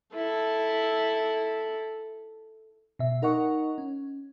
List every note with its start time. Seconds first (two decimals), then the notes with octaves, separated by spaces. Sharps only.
0.14 E4 A4
2.99 B2 E5
3.22 D#4 A#4 D#5 F#5 C#6
3.78 C#4